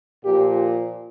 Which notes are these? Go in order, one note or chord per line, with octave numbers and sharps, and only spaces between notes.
A#2 F3 G4